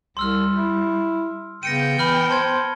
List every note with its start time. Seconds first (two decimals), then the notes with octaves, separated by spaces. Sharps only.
0.17 C2 G3 C6 E6 F6
0.56 E4
1.63 C#3 B3 G5 A#6 C#7 D#7
1.99 E3 B5 F6 G7
2.29 C5 A5 C6 G#6